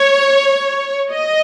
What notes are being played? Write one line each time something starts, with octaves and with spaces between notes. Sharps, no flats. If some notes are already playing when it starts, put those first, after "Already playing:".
Already playing: C#5
D#5